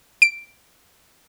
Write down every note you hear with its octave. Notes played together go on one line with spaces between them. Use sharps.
D7